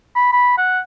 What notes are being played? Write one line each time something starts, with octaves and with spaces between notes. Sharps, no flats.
B5
B5
F#5